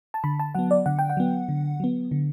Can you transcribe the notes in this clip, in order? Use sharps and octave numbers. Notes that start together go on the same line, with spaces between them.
A5
D3 B5
A5
F#3 B3 F#5
D5
D3 F#5
G5
F#5
F#3 B3
D3
F#3 B3
D3